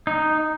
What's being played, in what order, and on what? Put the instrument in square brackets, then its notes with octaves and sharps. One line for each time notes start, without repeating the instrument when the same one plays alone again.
[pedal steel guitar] D#4